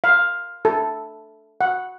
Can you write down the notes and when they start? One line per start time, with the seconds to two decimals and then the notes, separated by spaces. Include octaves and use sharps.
0.04 F5
0.65 A4
1.61 F#5